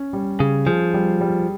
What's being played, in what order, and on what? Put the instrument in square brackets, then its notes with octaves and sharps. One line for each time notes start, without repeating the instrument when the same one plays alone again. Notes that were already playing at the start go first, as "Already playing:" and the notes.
Already playing: [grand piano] C#4
G3
[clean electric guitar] C#3 [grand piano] G#4
[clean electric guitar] F3 [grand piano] G#4
[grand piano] G3
G3